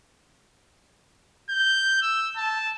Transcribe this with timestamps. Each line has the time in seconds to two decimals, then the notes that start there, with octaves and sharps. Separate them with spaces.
1.50 G6
2.02 E6
2.37 A5